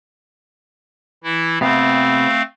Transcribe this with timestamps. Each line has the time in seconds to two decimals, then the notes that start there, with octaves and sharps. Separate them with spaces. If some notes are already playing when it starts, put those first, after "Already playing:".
1.24 E3 E4
1.61 C3 A3 B3 C4 F5